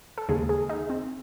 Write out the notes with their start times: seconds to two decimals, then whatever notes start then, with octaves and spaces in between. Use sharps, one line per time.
0.18 A4
0.29 D#2 C#3 G#3 G#4
0.49 G#4
0.69 D#4
0.90 C4